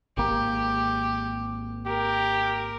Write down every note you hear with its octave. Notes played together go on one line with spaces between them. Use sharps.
G#1 A#3 G4
G4 A#4